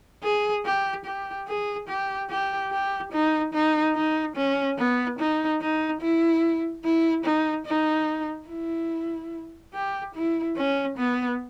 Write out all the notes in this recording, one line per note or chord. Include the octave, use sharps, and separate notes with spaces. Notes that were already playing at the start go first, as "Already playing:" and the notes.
G#4
G4
G4
G#4
G4
G4
G4
D#4
D#4
D#4
C#4
B3
D#4
D#4
E4
E4
D#4
D#4
E4
G4
E4
C#4
B3